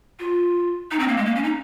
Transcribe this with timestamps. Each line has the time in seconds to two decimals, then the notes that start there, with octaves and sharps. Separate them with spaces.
0.19 F4
0.91 D#4
0.99 C4
1.08 A#3
1.17 G#3
1.26 A#3
1.35 C#4
1.43 D#4